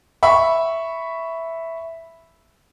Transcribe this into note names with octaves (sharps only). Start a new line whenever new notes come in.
E5 B5 C#6